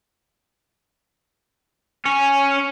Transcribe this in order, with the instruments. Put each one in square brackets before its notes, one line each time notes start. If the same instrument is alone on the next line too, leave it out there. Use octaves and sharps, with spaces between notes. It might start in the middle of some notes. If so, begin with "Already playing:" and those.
[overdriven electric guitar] C#4